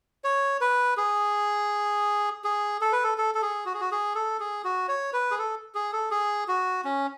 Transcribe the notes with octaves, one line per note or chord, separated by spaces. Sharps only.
C#5
B4
G#4
G#4
A4
B4
A4
A4
A4
G#4
F#4
G#4
F#4
G#4
A4
G#4
F#4
C#5
B4
G#4
A4
G#4
A4
G#4
F#4
C#4